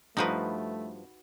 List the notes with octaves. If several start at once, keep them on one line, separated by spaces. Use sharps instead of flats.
G2 F3 A3 D#4 F#4 B4